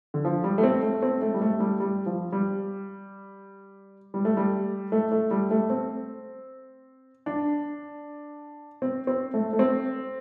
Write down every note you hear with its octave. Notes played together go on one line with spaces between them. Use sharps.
D3
F3
G3
A3
C4
A3
C4
A3
G3
A3
G3
G3
F3
G3
G3
A3
G3
A3
A3
G3
A3
C4
D4
C4
C4
A3
A3
C4